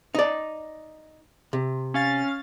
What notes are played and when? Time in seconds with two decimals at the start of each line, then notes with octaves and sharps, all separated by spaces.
0.15 D#4 D5
1.53 C3
1.94 C#4 F5 A6